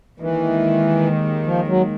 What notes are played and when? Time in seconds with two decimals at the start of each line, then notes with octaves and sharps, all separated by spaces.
0.20 D#2 D#3 E3 G#3
1.46 F3
1.67 F#3